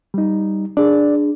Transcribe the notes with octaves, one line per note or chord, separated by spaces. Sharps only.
G3 D#4
D4 G#4 D5